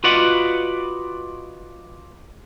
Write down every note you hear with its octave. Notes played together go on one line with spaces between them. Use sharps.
F4 F#4 B4 D5 D#5 F#5